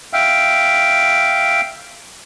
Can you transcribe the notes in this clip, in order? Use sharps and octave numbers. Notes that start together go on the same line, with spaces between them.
E5 F5 G5